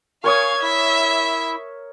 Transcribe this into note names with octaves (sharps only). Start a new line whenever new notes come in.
A#4 C#5 F5 G#5 C#6 D#6 G#6
E4 E5